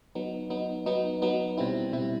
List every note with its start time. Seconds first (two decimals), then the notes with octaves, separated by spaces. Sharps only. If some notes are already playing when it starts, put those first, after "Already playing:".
0.15 F#3 B3 D#4
0.50 F#3 B3 D#4
0.86 F#3 B3 D#4
1.22 F#3 B3 D#4
1.57 B2 G3 C4 E4
1.93 B2 G3 C4 E4